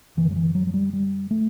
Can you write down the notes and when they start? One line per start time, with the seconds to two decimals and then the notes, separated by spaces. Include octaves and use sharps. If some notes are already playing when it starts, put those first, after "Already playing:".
0.17 F#2 D3 E3
0.31 F#3
0.36 E3
0.55 F#3
0.67 F#3
0.74 G3
0.93 G3
1.31 A3